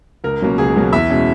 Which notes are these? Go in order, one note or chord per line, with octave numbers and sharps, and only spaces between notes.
C#2 A#4
B2 F#3 A#3 C#4
C#2 G#4
B2 F#3 A#3 C#4
E2 E5
B2 G#3 C#4